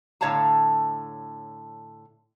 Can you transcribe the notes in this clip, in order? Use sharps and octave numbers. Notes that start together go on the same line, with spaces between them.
A2 D3 C#5 F5 A5 A#5